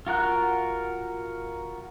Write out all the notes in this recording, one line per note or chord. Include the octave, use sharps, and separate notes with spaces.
F4 F#4 A#4 F#6